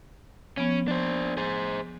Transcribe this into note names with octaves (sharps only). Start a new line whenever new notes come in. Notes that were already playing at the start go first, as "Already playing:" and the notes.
F3 B3 C#4
D4 C5
G#4 C5